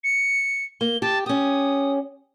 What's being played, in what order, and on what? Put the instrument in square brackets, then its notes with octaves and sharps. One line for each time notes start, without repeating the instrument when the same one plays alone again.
[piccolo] C#7
[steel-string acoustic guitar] A#3 [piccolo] G7
[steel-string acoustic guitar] G4 [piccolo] A5
[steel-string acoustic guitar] C#4 G4 [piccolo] D#6